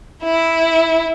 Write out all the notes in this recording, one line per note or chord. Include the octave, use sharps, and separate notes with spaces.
E4